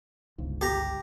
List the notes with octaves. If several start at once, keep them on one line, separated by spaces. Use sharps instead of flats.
G1 C#2 G#2
G4 A#5